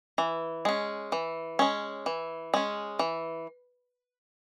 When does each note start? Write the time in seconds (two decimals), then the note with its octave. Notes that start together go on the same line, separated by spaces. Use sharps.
0.18 E3
0.65 G#3 C#4
1.12 E3
1.59 G#3 C#4
2.06 E3
2.54 G#3 C#4
2.99 E3